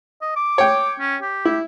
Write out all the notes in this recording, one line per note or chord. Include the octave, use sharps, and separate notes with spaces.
D#5
D6
C#5 G5
C#4
G4
E4